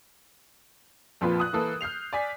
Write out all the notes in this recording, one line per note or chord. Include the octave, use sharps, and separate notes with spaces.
A#1 F2 A#2 F3 F4 B4
D#6 F#6
E3 A#3 A4 B4
F6 G6 C7 F7
D5 G#5 B6